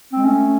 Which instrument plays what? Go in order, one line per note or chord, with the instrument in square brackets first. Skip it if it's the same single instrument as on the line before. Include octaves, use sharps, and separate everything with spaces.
[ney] G#3 [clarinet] C4
[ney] A3 [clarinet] C#4